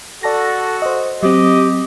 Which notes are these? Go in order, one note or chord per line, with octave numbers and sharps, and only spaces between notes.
F#4 A4 D5 A5 A#6
C5 D#5
F#3 C4 G4 D#5